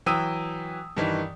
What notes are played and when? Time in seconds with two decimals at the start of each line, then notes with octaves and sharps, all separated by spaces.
0.06 E3 F#3 G5 D#6 E6 D#7
0.97 G2 D#3 E3